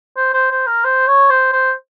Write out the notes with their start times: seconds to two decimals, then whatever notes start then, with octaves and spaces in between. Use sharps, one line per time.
0.17 C5
0.33 C5
0.51 C5
0.67 A#4
0.85 C5
1.07 C#5
1.30 C5
1.52 C5